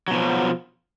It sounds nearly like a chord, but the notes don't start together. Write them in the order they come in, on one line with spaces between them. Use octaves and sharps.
F#3 B2 F3